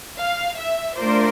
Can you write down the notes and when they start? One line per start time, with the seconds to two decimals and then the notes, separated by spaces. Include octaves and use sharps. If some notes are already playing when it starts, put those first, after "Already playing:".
0.19 F5
0.58 E5
0.97 A3 D4 F4 A#4 C5 D5